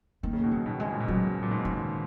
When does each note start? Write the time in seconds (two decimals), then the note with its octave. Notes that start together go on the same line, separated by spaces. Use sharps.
0.23 D#3 A#3
0.33 C#3
0.44 B2 D#3
0.51 F#3
0.66 B2 D#3
0.80 G#2 G#3
0.92 A#2
1.00 B2
1.08 A#2 C#3 F#3
1.43 A#2
1.51 G#2 B2
1.65 D#3